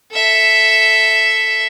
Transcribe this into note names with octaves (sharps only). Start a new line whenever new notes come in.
A4 E5